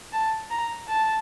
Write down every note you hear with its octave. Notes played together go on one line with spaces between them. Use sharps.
A5
A#5
A5